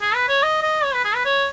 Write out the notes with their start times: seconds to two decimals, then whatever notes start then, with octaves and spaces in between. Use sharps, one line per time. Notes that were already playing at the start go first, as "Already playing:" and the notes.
0.01 G#4
0.15 B4
0.28 C#5
0.43 D#5
0.62 D#5
0.84 C#5
0.94 B4
1.05 G#4
1.15 B4
1.25 C#5